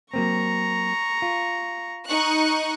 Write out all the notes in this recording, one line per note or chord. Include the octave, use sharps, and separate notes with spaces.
F#3 A#3 C4 A#5 C#6
F4
D#4 C#6 F#6